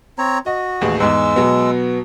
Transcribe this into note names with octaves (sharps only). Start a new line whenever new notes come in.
C4 C#5 A#5
F#4 D#5
A1 D#2 G#4
E2 G#2 G#3 E6
B2 F#3 B3